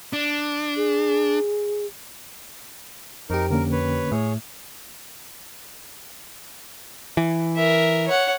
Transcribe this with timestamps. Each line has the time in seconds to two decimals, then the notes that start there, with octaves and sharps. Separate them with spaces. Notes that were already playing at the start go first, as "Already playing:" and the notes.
0.13 D4
0.77 G#4
3.30 F2 D#4 G4 A#4
3.50 D3 A#3 C#4 A#4
3.72 B4 C#5
4.12 A2 G#4 C#5
7.17 E3
7.56 A#4 E5
8.07 C#5 F#5